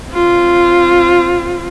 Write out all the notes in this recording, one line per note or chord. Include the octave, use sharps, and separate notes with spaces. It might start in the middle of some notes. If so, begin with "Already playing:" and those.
C4 F4